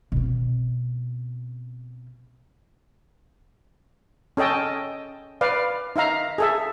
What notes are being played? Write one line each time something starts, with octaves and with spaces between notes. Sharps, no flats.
B2 C4
C#4 A4 D#5 G5 A5
B4 D5 F5
D#4 E5 F5 A#5
G#4 A4 E5